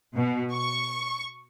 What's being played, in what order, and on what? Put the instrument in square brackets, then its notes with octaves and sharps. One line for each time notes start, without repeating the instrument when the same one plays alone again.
[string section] B2
C#6